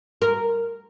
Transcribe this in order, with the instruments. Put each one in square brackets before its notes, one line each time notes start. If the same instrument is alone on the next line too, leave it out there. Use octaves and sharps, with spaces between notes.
[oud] A#4